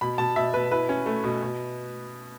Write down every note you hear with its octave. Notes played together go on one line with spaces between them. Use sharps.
B2 B5
B2 A5
B2 E5
B2 B4
E4 B4
C#4
A3
B2
B2